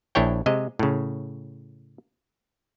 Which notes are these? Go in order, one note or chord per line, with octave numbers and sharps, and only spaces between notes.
A#1 D4 E4 C#5 G5
C3 G#3 D#5
A2 C#3